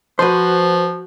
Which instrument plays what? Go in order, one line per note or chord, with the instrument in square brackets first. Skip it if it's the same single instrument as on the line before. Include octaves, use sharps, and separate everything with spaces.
[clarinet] F3 [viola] F#4 [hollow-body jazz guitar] B4 C5